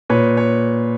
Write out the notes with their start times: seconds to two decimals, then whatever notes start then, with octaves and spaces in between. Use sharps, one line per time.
0.10 A#2 B4 C#5
0.37 C#5